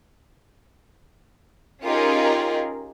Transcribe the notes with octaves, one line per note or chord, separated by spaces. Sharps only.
C#4 D#4 F4 G4 G#4 A#4